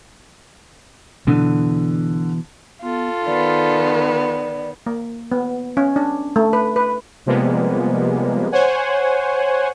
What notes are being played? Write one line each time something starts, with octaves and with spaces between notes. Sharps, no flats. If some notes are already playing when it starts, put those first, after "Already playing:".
B2 D3 E3
B3 F4 A4
D#3 B3 D5
A#3
B3
C#4
D4
A3
B4
B4
C3 F3 G3 G#3 A#3 B3
C5 C#5 F#5 G#5